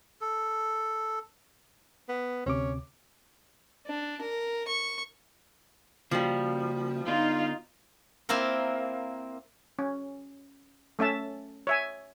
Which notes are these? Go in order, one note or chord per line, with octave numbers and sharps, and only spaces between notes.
A4
B3
D2 C3 C#4 D6
D4
A#4
C#6
C#3 F3 G3 A#3 F#4
D3 B3 D#4 F4 D5
A#3 C4 E4 F4 A#4
C#4
A3 C#4 E5 A5
C#5 E5 G#5